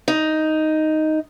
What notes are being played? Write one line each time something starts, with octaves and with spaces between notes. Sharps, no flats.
D#4